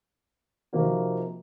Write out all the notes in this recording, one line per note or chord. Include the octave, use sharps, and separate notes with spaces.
C3 F3 A#3 D#4 F#4